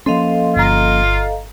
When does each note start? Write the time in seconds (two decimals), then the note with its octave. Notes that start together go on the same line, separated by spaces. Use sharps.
0.06 F3 A#3 C#4 A4 D#5 F5 C6
0.56 G1 F4 A#5